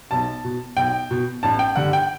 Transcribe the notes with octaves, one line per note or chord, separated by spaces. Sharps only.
B1 A5
B2
B1 G5
B2
A1 A5
G5
G2 D3 F#5
G5